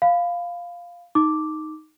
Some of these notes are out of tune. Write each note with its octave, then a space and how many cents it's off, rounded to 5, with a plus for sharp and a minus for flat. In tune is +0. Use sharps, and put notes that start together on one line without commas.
F5 +0 B5 +25
D#4 +0 D6 -5